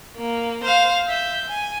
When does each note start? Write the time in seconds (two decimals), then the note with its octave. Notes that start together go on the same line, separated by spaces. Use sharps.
0.18 A#3
0.64 C5 F5
1.07 E5 G6
1.50 G#5